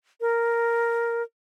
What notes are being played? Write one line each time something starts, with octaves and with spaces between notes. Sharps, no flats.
A#4